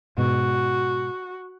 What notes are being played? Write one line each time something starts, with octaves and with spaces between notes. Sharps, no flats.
G#2 B2 F#4